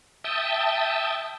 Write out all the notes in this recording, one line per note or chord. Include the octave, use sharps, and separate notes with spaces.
E5 G5 A5 D#6